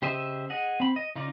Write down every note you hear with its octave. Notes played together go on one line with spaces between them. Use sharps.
C#3 G4 C5 D#5 E5
G#4 D#5 F#5
C4 B5
D#5
C#3 D#4 F4 D5